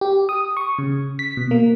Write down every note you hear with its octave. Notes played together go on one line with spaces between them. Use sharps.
G4
D#6
C#6
C#3
B6
B2
A#3